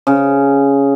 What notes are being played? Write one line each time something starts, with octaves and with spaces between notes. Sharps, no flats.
C#3